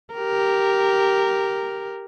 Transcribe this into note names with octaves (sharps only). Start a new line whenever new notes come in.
G4 A#4